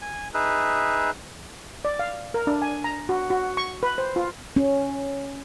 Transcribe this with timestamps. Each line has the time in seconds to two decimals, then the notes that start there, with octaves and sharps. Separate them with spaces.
0.02 G#5
0.34 D#4 G#4 B4 E5
1.85 D5
1.99 F5
2.34 A#4
2.47 D4
2.62 G#5
2.84 A#5
3.09 F#4
3.30 F#4
3.57 C#6
3.83 B4
3.98 C5
4.16 F4
4.56 C#4